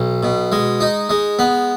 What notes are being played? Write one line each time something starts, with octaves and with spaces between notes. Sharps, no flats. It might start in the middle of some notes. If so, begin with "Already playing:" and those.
Already playing: B1
B2
G#3
D#4
G#3
B3